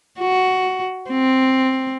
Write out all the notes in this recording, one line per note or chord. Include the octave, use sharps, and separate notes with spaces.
F#4
C4